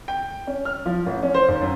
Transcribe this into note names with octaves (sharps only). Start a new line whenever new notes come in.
G5
C#4
F6
F3
A1
C#4
C5
D#2
F#2